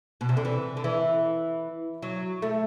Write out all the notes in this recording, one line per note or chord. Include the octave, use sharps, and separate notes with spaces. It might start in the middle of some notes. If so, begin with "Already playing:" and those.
B2
C3
D3
E3
D3
E3
F#3
A3